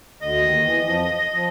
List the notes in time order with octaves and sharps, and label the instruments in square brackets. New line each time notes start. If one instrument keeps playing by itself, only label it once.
[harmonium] D2 D3 [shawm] D#5
[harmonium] D#2 D#3
E2 E3
F2 F3
F3